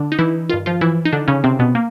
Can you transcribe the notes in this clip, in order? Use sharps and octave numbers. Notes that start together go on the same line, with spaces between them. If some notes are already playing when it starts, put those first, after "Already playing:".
Already playing: D3 D4
D#4
E3 E4
G2 D#3 F4
F3 F4
E3 E4
D#4
D3 D4
C#3 C#4
C3 C4
B2 B3
A#3